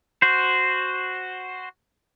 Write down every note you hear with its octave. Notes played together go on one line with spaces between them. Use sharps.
F#4 C5